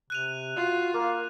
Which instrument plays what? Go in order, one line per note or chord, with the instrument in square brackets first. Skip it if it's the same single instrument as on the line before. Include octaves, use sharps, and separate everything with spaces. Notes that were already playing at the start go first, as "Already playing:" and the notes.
[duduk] C3 [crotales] F#6 D#7 F7
[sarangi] F4 [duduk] F#4
[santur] A#3 [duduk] A#4